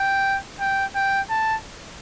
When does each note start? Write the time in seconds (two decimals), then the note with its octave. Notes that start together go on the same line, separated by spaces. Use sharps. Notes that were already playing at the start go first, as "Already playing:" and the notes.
Already playing: G5
0.60 G5
0.95 G5
1.30 A5